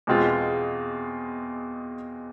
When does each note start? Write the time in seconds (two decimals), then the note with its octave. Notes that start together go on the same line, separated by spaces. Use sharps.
0.07 E2 B2 G#3 C4 F4